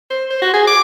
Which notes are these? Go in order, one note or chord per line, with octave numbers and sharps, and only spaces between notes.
C5
C5
F#4
G#4
D6